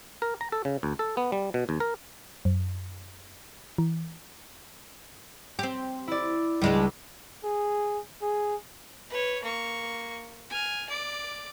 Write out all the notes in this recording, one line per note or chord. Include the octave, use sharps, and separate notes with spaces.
A#4
A#5
A4
C#3
D2
A4
B3
G3
B2
D#2
A#4
F#2
E3
C4 G4
E4 D5
C#2 G3 G#3 D4
G#4
G#4
B4 C#5
A#3 C#6
G#5 F6
D5 D6